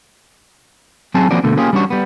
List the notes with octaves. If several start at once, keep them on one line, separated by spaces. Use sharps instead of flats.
F#3 C4 C#4 E4 G#4 A5
F3 A#3 C4 C#4 F#4 D5
B2 D3 A3 A#3
A#3 C#4 F4 G4 G#4
G3 C#4 D4 F#4 C#5
G3 B3